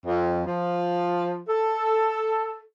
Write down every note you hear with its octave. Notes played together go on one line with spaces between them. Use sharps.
F2
F3
A4